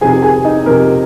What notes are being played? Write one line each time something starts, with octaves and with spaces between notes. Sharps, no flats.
F2 C3 D#3 G#4 G#5
G#4 G#5
D#4 D#5
F2 C3 D#3 A#3 A#4